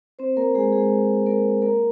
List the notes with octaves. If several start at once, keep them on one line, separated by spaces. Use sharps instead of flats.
C4 C5
A#3 A#4
G#3 G#4
G#3 G#4
A#3 A#4
A#3 A#4